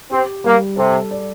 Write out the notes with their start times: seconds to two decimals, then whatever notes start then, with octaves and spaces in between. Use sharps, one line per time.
0.11 C4 G4
0.44 G3 A#3
0.77 C3 A4
1.11 D5